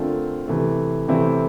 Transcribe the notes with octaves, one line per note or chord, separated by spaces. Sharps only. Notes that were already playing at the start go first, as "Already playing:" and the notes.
Already playing: D3 A3 C4 F4 A#4
C3 E3 A3
C3 E3 A3 C4 E4